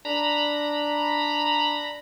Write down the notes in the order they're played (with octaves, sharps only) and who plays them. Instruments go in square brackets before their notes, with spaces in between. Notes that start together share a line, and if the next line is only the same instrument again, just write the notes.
[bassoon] D4 [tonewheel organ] A#5 B5